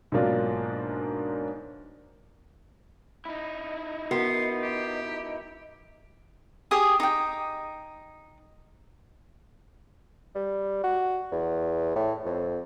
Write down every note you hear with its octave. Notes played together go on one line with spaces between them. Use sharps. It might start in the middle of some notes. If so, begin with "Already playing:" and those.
G#2 B2 F#3 A#3 D4 F4
D#4 E4
B3 F#4 A#4 C6
G4
G4 G#4 G#5 D#6
D#4 G5
G3
F#4
E2
A2
F2